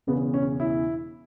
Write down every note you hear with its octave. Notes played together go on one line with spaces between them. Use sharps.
E1 E2 C#3 B3
C#4
E4